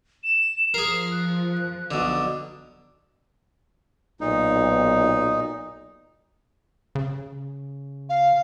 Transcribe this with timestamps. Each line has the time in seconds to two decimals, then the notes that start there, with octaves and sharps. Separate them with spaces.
0.24 E7
0.74 F3 G#4 A#4 C7
1.12 F#6
1.91 B1 D3
4.21 B1 A#2 D#4
6.95 C#3
8.09 F5